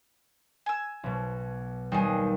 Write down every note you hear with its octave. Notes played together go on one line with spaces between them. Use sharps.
G#5 E6
B1 B2
D#2 G3 C4 D#4 G#4